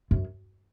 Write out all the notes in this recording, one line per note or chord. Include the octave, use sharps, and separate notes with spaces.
F#2